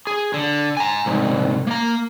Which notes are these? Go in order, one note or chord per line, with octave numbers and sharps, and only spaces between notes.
G#4
D3
G#5 A#5
C2 G#2
A#3 A#5